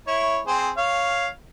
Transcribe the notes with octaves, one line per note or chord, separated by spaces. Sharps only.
E4 C#5
C4 G#4 C5
C#5 F5